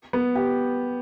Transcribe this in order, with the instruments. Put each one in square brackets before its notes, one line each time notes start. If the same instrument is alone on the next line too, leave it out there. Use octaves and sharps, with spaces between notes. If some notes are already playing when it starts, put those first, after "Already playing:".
[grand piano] B3
G4